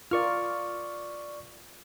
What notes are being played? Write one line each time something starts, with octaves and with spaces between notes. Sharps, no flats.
F4 A#4 D5 C#6 F6